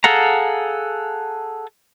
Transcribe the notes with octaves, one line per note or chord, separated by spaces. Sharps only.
G#4 A4 F5 F#5 A#5